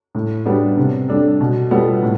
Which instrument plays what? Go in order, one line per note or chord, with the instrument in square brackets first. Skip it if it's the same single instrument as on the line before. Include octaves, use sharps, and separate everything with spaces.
[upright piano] A2
G3 B3 D4
C3
G3 D4 A4
B2
G3 B3 F4 A4
A2